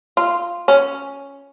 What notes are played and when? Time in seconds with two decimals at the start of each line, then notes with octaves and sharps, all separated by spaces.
0.17 F4
0.68 C#4